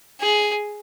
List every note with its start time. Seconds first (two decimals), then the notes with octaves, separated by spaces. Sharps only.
0.21 G#4